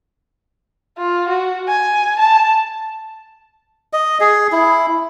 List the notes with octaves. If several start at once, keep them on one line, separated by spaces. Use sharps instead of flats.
F4
F#4
G#5
A5
D#5
G#4
E4